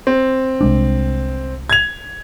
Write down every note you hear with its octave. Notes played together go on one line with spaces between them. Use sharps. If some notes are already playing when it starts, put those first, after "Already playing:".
C4
C2 G#3 D4
G#6 F7